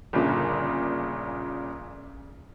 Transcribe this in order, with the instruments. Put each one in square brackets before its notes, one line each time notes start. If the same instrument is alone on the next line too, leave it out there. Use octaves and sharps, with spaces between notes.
[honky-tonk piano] G1 A#2 C#3